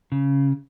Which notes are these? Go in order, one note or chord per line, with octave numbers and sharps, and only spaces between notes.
C#3